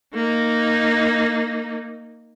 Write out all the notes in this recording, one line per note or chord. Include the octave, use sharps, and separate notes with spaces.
A#3 D#4